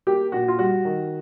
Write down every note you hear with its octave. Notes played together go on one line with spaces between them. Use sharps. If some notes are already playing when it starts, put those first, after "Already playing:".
A#3 G4
A#2 F#4
F4
G3 F#4
D#3